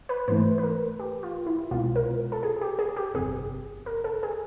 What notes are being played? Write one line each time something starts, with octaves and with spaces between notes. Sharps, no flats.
B4
G#2 E3 A3 C5
B4
A#4
G4
F4
E4
C2 B2 G#3 F4
A#4
A4
G#4
G4
G#4
G4
G1 F2 C3 G#4
A#4
A4
G#4